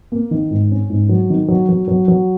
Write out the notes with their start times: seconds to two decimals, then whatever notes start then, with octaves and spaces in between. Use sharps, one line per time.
0.12 A#3
0.31 D#3
0.51 G#2
0.71 C#4
0.90 G#2
1.09 F#3
1.30 D#3
1.48 F#3
1.69 F#3
1.88 F#3
2.08 F#3